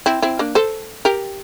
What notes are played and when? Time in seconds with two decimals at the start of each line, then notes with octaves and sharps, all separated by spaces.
0.06 C4 E4
0.22 C4 E4
0.39 A#3 D4
0.55 A4 C5
1.05 G4 A#4